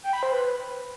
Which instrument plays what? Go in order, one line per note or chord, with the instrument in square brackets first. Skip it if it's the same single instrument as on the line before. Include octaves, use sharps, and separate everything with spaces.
[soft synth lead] G5
B5
C5
B4